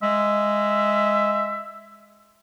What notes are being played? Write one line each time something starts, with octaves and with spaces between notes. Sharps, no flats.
G#3 E5